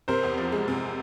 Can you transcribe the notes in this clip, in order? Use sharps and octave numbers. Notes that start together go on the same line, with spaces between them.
C3 A#4 C5
E2
F3
G#3
C3